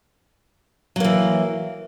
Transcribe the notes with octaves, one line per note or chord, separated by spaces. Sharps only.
E3 F#3 A#3